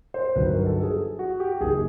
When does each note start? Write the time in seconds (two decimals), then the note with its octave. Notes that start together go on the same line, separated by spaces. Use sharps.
0.14 C5
0.36 G1 F#2 D#3 F#3 B4
0.52 A#4
0.66 A4
0.83 G#4
1.19 F#4
1.40 G4
1.60 F#1 F#2 D#3 G#4